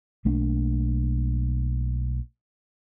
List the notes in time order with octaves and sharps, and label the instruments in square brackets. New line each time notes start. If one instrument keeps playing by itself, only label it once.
[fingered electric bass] B1 A3 A#3 D4